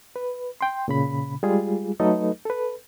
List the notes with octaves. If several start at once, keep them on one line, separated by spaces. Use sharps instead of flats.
B4
G5 C6
A#2 C#3 B5
G3 G#3 F4 G#4
F#3 A3 D#4 A4 B4 D#5
A4 B4